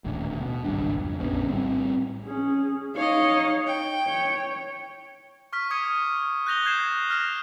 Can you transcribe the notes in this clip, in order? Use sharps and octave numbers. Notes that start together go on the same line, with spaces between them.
D#1 A1 D2
B2
G#1 C#2 G2 D4
F2
A#1 D3 B3 C#4
A2 G3 C4
C#4 G#4
D#4 C#5 D#5 F5
G5
C#5
C#6 F6 B6
D6 D#6 G#6 C#7 D#7
F#6 G6 A#6 F7 G7
G6 G#6 C7 E7
F6 A#6 F7